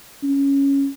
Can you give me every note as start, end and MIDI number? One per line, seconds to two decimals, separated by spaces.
0.23 0.88 61